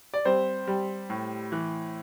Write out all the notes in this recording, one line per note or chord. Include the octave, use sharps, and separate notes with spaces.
D5
G3 C4 C5
G3
A2
E3